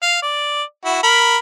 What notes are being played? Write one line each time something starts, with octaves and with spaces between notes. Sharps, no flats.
F5
D5
E4 F#4
A#4 B5